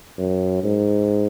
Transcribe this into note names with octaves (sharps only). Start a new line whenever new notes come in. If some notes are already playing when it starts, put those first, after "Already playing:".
F#2
G#2